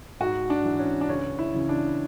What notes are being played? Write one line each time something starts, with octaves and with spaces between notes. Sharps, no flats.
G#2 F#4
D4
E3
C#4
D4
C#2 C#4
E4
C#3 E3
D4